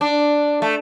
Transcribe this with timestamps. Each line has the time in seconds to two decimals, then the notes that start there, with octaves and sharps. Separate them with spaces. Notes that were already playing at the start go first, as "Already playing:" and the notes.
0.01 D4
0.62 A3